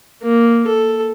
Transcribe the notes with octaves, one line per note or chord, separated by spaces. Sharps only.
A#3
A4